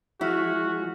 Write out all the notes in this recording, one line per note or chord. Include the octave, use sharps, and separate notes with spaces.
F3 G#3 E4 F#4 E5 F6